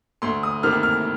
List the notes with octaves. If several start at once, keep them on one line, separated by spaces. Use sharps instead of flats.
D2 C6
D#6
C3 D#3 A#3 F6
F6